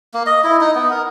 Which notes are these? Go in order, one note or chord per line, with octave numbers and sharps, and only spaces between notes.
A#3
D#5
E4
D#4
B3
A#4